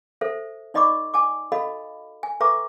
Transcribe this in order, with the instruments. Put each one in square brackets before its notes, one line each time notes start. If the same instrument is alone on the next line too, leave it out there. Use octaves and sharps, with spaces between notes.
[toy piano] A4 C5 E5
D#4 D5 D#5 B5 C#6 D6
G#5 A5 D6
F#4 A4 D#5 F5 B5
G#5
A4 B4 E5 A#5 C#6 D6